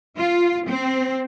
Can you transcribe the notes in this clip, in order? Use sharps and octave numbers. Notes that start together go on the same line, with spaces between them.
F4
C4